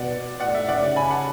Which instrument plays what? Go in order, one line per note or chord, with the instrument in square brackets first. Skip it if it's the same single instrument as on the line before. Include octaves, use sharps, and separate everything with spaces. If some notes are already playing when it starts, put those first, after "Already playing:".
Already playing: [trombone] B2 [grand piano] D5 F#5
[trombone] A2 [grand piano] D5 F#5
[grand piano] E5
[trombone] C#3 [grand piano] D5 F#5
[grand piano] G#5 B5
F#5 A5